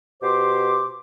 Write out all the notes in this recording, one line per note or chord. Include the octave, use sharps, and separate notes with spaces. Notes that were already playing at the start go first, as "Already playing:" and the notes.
B2 G4 C5 C6 D6